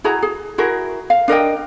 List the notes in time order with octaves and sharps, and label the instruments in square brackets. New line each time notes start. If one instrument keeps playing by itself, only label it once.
[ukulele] E4 F#4 G#4 A#5
G#4
E4 F#4 G#4 A#4
F5
D4 A#4 D#5 G5